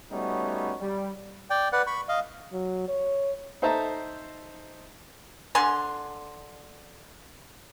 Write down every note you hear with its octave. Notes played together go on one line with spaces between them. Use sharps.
G3 A3 B3 C#4 D#4 F#4
G3
D5 G5
B4 D5 F#5
B5 C#6
D#5 F5
F#3
C#5
D#4 A4 C5 E5 A5 A#5
D3 G#5 C6